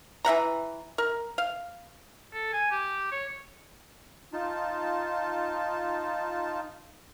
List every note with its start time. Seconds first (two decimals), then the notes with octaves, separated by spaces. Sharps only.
0.25 E3 E5 F#5 A#5
0.98 A#4
1.38 F5
2.33 A4
2.53 G#5
2.71 G4
3.11 C#5
4.33 D#4 F4 A5